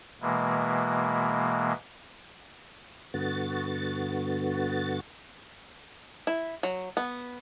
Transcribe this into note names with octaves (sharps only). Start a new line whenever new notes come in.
B2 E3 G#3 A#3
G2 D3 B3 F#4 A6
E4
F#3
B3